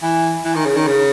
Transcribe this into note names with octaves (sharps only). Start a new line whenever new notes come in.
E3
E3
D#3
C#3
D#3
C#3